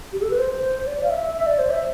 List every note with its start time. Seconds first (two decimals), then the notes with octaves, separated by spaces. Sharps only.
0.13 G4
0.22 A4
0.30 B4
0.38 C5
0.87 D5
1.03 F5
1.10 E5
1.34 E5
1.47 D5
1.59 C5
1.71 E5